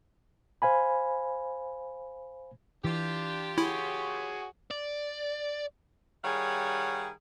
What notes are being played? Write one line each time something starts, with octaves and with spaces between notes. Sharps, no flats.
C5 F5 G#5 B5
E3 D4 F4 G4
E4 F#4 G#4 C#5
D5
D#3 G3 G#4 C#5 F5 F#5